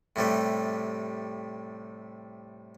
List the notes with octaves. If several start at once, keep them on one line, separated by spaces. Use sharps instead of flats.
A2 C3 G3 A3